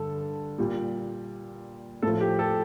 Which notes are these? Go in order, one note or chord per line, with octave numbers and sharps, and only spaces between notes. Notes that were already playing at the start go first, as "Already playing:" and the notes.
Already playing: G2 D3 A4
A#2 G3
A2 F3 A4
G4
A4